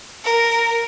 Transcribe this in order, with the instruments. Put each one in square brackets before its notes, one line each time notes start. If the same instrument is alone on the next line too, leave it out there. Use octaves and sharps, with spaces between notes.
[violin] A#4